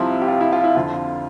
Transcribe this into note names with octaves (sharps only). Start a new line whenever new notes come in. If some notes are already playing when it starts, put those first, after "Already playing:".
Already playing: C2 C3 F3 E4
G4
F4
E4
F4
E4
F2 D3 F3 F4